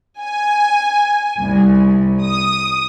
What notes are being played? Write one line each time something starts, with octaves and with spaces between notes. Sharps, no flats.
G#5
C2
D#6